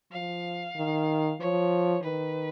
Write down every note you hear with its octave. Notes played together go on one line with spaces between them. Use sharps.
F3 F5
D#3
F3 C#5
D#3 B4